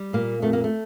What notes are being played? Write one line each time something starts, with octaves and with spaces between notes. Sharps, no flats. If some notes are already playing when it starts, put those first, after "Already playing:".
Already playing: G3
A#2 A#3
F2 A3
A#3
A3